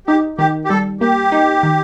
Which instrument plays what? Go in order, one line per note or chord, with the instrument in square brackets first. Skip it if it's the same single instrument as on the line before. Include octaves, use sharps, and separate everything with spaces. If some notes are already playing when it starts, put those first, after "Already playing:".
[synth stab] D#4 [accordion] G4
[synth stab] D#3 [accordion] G4
[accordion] G4
[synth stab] G3 [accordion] A4
[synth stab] A#3 [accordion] G4
[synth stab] D#4
D#3